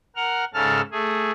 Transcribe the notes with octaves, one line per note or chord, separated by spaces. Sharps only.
A#4 F#5 F6
G#2 C#3 A4 A5 F6
A3 G#4